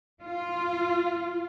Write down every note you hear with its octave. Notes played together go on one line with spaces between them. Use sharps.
F4